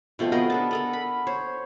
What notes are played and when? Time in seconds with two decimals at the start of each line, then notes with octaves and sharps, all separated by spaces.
0.19 B2 F3 A3 C4
0.32 B3 G#4 A#4 D#5
0.50 D4 A4 A5
0.71 B3 A4 A#4
0.93 B5
1.27 C5 C#5